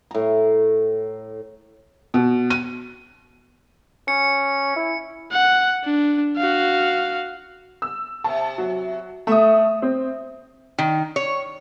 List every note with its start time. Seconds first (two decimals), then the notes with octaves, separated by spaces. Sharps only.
0.11 A2 A#5
2.14 B2
2.50 D#7
4.08 C#4 C#7
4.76 E4
5.31 F#5
5.84 D4
6.37 F#4 F5
7.82 E6
8.24 C3 A5
8.58 F#3
9.27 A3 E5 D#6
9.82 C4
10.78 D#3
11.16 C#5